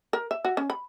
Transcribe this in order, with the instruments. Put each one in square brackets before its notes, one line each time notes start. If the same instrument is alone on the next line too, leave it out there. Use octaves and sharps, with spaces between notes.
[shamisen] A#4
E5
F#4
C#4
B5